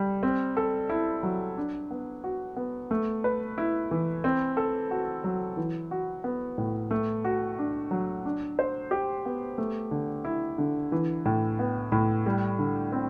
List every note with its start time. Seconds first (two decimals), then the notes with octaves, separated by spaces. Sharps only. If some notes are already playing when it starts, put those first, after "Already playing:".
Already playing: G3
0.23 C4
0.57 A4
0.90 E4
1.23 F#3
1.57 D4
1.91 B3
2.24 F#4
2.56 B3
2.91 A3
3.24 B4
3.58 E4
3.91 E3
4.24 C4
4.57 A4
4.91 F#4
5.24 F#3
5.57 E3
5.91 F#4
6.24 B3
6.58 A2
6.91 A3
7.25 F#4
7.59 D4
7.91 F#3
8.25 D4
8.59 C5
8.91 G4
9.26 B3
9.58 A3
9.91 D3
10.25 E4
10.58 D3
10.92 E3
11.25 A2
11.59 B3
11.92 A2
12.26 G3
12.59 D3
12.92 C4